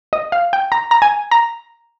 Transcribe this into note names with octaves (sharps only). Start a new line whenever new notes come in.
D#5
F5
G5
A#5
A#5
G#5
A#5